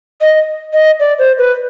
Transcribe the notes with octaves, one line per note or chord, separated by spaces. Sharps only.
D#5
D#5
D5
C5
B4